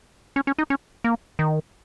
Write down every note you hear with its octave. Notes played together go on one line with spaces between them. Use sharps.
C#4
C#4
D#4
C#4
A#3
D#3